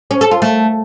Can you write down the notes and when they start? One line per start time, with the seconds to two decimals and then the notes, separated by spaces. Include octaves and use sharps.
0.11 C#4
0.21 A4
0.31 F4
0.42 A3